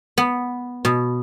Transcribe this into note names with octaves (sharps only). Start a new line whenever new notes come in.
B3
B2